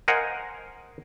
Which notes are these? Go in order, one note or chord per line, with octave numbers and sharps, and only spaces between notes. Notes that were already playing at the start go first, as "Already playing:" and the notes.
A#4 C5 D#5 F5 F#5 G#5